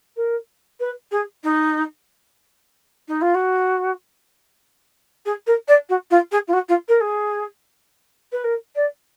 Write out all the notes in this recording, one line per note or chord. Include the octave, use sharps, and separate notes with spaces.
A#4
B4
G#4
D#4
D#4
F4
F#4
G#4
A#4
D5
F#4
F4
G#4
F4
F#4
F4
A#4
G#4
B4
A#4
D5